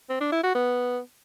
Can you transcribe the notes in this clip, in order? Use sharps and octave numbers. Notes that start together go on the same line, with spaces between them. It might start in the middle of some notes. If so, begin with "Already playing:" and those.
C4
D4
E4
F#4
B3